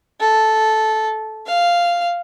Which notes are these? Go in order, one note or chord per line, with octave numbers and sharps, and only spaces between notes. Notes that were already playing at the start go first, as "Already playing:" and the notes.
A4
F5